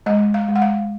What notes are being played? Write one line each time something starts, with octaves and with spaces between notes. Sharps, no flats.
G#3 D#5
F5
G#3
F#5
F5